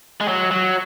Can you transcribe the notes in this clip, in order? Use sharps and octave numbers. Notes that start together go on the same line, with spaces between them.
G#3
F#3
F#3